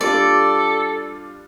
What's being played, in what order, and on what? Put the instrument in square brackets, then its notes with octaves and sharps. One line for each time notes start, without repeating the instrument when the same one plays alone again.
[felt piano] G3 D4 F4 [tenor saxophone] A4 [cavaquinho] D5